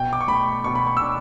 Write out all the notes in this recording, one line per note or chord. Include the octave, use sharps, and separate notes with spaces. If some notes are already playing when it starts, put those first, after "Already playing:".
Already playing: B2 G5
D6
C#6
A3 B5
B2 C#6
B5
C#6
E6
D4 D6